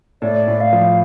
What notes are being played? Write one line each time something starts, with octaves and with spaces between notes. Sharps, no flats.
A2 D5
A2
F5
F3